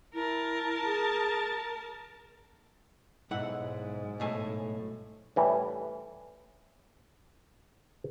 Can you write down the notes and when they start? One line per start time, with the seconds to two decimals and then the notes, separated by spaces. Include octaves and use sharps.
0.14 E4 A#4 A5
0.84 G#4
3.31 B1 G#2 E4 F#5
4.20 B1 A2 G#5
5.36 A2 E3 G3